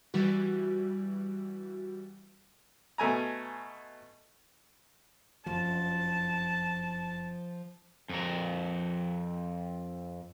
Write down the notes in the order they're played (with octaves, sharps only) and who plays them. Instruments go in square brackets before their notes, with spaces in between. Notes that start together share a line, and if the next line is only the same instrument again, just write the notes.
[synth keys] E3 G3 F#4
[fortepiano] B2 A3 G#5 A#5
[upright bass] F#1 F2 [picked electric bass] F3 [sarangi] A5
[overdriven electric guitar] F2 A#4